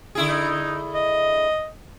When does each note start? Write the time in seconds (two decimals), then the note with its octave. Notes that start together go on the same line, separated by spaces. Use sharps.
0.15 D3 E4 G#4
0.29 D#4
0.95 D#5